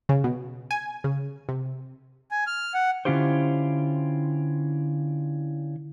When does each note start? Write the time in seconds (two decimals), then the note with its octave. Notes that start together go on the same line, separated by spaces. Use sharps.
0.09 C#3
0.24 B2
0.71 G#5
1.04 C#3
1.49 C3
2.31 G#5
2.47 F6
2.74 F#5
3.05 D3 C#4 E4 F4 G4 C5